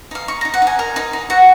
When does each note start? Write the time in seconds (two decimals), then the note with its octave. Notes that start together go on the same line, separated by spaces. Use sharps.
0.11 D#4 F5
0.28 D#4 C#6
0.41 D#4 A#5
0.54 F#5
0.62 D#4 G#5
0.79 A#4
0.96 D#4
1.13 D#4
1.30 F#4 F#5